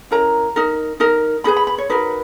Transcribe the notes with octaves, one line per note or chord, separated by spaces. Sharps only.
C#4 E4 A#4 A#5
D#4 A#4
D#4 A#4
D#4 G#4 B4 B5
B5
B5
C#5
D#4 F#4 A#4 B4